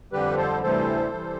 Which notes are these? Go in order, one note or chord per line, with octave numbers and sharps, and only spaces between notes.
F2 D3 G3 G4 B4
A4 C5
D2 C3 E3 G3 A4 C5
C3 E3 G3